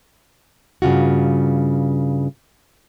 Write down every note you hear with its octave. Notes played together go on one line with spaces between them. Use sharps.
G2 C#3 F4 F#4